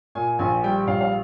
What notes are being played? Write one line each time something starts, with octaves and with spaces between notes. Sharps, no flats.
A#2 G#5
A#1 G#5
G3 G5
A#1 F5
F5